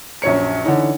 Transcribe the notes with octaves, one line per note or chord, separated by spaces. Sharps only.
A#1 F#2 C#5 C#7
D3 E3 C#4 D#4